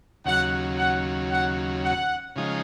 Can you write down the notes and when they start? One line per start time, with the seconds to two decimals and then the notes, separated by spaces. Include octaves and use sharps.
0.25 D#2 C#3 F#3 F#5
0.78 F#5
1.31 F#5
1.84 F#5
2.36 C#3 F3 G#3 D#4